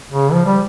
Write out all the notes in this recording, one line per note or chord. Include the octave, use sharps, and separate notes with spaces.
C#3
F3
G3